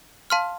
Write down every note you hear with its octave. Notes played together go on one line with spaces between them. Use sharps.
F5 A5 C6 F6